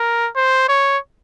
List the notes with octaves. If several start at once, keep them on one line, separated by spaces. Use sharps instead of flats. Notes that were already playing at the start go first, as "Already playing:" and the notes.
Already playing: A#4
C5
C#5